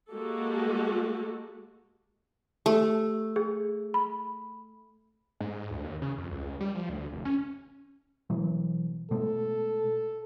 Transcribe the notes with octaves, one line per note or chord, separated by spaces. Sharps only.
G#3 A#3 F#4 G4 A4
A3 G4
G#4
B5
G#2
D2
D#2
C#3
F2
C#2
G3
F3
D2
F1
C#4
B2 E3 F#3
B2 G#3 A3 A4